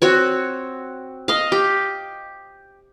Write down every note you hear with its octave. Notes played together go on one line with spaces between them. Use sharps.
C4 F#4 C#5
D#5 F5
G4